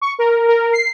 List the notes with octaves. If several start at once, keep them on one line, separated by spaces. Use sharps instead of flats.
C#6
A#4
A#4
C7